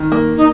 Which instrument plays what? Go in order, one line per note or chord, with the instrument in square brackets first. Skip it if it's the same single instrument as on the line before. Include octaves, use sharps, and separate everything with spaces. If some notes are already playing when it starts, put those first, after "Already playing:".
Already playing: [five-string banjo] D#3
A#3
[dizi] D#4